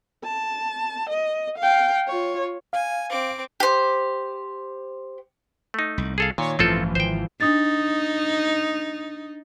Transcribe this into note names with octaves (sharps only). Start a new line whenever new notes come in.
A5
D#5
F5 G5
F4 C#5
F5 G#5
C4 D6
G4 C5
A3 D#4
C2
G#4 A4 F5
A#2 D#3 C#5
A1 G2 E3 F3 C4 F4 A4
G#1 C5 G5
D4 D#4 D#6 A6